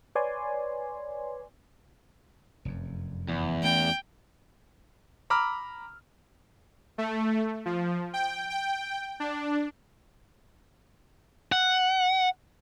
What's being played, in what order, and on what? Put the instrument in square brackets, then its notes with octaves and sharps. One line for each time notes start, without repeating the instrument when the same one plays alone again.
[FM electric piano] B4 C#5 D5 G#5 C6
[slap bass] F1 F#2
[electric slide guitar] E2
[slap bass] A3 C#4 [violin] G5
[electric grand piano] A#5 B5 D6 E6 F6
[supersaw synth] A3
F3
G5
G5
D4
[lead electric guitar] F#5